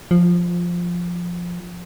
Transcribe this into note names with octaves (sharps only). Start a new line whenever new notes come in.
F3